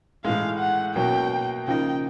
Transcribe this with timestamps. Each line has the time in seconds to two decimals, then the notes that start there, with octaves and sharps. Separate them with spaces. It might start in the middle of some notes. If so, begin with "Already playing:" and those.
0.24 A2 E3 G#3 F5
0.60 F#5
0.95 B2 F#3 A#3 C#4 G5
1.67 C#3 F3 A#3 D#4 G5